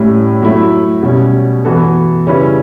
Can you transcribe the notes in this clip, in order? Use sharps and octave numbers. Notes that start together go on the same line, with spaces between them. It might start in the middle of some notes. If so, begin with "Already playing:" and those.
Already playing: A2 G3 C#4 E4
F#3 A3 E4
B2 G3 C#4
E3 B3 F#4 A4
C#3 G3 C#4 E4 B4